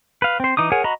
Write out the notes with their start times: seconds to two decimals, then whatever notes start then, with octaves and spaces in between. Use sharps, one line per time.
0.22 B4 F5
0.40 C4 C5
0.57 E3 D#4 D6 D#6
0.72 G#4 A#4 C#5 F#5 G#5
0.84 F#4 D#5 A#5 B5